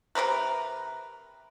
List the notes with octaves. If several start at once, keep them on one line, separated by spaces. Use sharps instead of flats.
C3 F3 A#4 B4